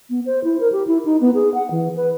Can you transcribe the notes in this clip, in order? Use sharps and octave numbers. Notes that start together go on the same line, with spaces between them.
B3
C5
E4
A#4
G4
E4
D#4
B3
G#4
F#5
E3
B4